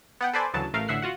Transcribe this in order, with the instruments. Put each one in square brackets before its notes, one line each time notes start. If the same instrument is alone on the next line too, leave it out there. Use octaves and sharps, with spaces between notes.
[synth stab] B3 F#5 G5
A4 B4 C5 D5 G#5
D2 C#3 E3 F#3 A5
A1 A3 A#4 F5
A1 D3 E5 F#5 C7
F4 F#4 F#5